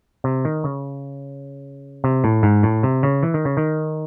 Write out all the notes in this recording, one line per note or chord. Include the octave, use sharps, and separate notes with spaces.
C3
D#3
C#3
C3
A2
G#2
A2
C3
C#3
E3
D#3
C#3
D#3